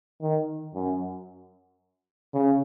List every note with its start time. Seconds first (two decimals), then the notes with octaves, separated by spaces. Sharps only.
0.21 D#3
0.74 F#2
2.34 C#3